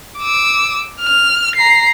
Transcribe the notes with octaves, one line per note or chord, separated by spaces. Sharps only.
D6 E6
F6
A#5 C7